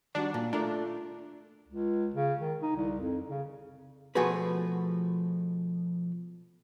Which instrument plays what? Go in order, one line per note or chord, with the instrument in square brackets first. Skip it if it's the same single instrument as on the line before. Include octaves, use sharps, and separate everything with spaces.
[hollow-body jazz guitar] D#3 G3 F#4 [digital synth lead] D4
[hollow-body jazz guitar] A#2
[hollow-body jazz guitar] A3 F4 A#4 [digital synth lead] D4
[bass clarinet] C#2
C#3
D#3
D#4
C2
F2
C#3
[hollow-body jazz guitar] B2 F3 A3 F#4 G#4 B4